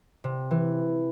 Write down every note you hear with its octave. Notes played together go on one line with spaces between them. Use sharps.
C3
E3